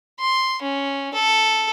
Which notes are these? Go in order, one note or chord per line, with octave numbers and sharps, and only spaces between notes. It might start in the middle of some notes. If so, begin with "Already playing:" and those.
C6
C#4
A4